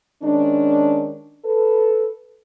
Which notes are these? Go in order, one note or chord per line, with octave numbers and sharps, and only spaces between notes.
D#3 G#3 C#4 D4
A4 B4